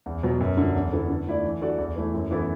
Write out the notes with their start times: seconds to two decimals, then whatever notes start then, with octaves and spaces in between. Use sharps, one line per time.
0.06 E2
0.23 B2 F#3 B3
0.40 F#2
0.57 D3 F#3
0.76 E2
0.92 D3 B3 E4 A4
1.09 D3
1.27 A3 E4 A4 D5
1.44 E3
1.61 D4 F#4 A4 D5
1.78 E2
1.96 E3 A3 E4 B4
2.14 F#2
2.31 E3 B3 E4 A4